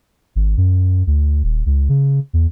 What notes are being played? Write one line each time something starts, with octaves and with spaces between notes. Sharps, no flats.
G#1
F#2
D2
D#1
C#2
C#3
E2